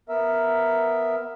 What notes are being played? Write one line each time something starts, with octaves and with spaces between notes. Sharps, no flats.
B3 A#4 E5